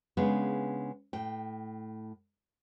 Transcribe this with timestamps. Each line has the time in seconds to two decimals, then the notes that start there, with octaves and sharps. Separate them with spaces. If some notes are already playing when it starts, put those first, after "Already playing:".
0.17 C#3 G#3 B3 D4
1.13 A2 G5